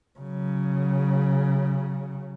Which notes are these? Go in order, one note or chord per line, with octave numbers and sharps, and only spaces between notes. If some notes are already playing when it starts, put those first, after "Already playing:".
C#3 F#3